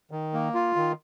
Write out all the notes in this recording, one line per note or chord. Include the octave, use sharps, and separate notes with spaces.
D#3
A#3
F4
D#3